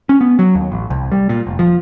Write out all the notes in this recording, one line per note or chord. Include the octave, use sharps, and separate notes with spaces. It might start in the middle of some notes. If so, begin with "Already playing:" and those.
C#4
B3
F#3
D#2
A1
C2
G3
A#2
F1
F3